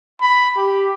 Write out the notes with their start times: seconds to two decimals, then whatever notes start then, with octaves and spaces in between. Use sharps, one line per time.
0.21 B5
0.56 G4